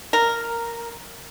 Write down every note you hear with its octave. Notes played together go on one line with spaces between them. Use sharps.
A#4